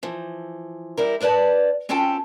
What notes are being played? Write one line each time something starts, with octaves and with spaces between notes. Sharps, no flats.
E3 F3
G3 E4 A#4
D4 A#4 B4 D5 A5
C4 C#4 F4 A4 G5 A5